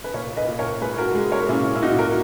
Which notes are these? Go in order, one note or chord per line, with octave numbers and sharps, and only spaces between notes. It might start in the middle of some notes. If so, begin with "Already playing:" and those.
B4
A#2 A#4 C#5
B4 D#5
A#2
A#4 C#5
G#3 G#4 B4
F#4 A#4
G#3
A#4 C#5
A#2 C#4 E4
E4
A#2 D#4 F#4
F#4 A#4